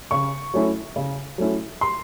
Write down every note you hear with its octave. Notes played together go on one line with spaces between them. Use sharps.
C#3 C#6
F#3 A3 C#4 E4
C#3
F#3 A3 C#4 E4
C6